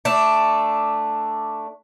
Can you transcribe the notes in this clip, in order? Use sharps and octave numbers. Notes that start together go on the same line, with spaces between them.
A3 D4